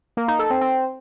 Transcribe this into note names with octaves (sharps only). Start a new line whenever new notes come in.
A#3
D#4
A4
C4
C4